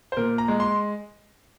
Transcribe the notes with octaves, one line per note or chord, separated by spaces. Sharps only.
C5
A#2 A#4
A#5
G#3
C6